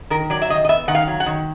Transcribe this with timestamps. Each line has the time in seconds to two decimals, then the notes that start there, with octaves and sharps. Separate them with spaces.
0.10 D#3 A#4
0.30 F#3 D5
0.42 E5
0.50 D#3 D#5
0.65 D#5
0.69 B3 E5
0.88 D#3 F#5
0.95 F5
1.08 F#3
1.20 F#5
1.26 D#3